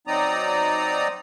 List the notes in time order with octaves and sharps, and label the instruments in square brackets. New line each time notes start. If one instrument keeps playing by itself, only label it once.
[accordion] F#3 C4 D#4 D5 A#5 D#6